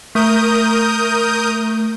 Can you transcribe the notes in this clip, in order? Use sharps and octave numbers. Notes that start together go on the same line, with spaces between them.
A3 A#4 D#6 G6